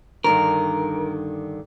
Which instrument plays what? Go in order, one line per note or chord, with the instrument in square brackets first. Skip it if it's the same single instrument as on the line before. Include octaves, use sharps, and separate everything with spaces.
[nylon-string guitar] G2 D3 D#3 [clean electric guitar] A#4